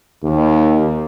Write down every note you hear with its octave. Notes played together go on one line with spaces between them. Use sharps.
D#2